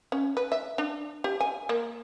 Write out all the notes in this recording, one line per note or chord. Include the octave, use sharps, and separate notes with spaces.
C#4
B4
E5
D4
G4
G#5
A#3